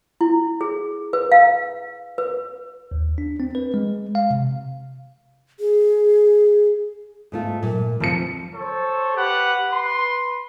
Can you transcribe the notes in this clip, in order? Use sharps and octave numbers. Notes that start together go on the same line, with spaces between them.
E4
G#4
B4
F5
B4
D#2
D4
C4
B4
G#3
F5
C3
G#4
G#2 A3 F4
A#2 F#3
F1 D2 F3 C#7
A4 C5 C#5
G4 B4 F#5
B4 C6